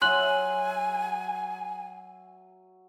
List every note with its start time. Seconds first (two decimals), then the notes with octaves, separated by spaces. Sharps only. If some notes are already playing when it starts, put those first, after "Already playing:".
0.02 F#3 E5 G#5 C6 F#6 F#7